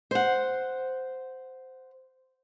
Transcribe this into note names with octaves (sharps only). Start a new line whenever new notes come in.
C5 F#5